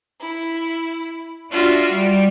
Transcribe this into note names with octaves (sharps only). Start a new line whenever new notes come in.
E4
D4 F4 F#4 E5
G3